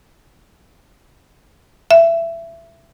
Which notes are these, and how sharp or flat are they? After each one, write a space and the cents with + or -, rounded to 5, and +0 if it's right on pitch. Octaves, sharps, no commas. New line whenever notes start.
E5 +20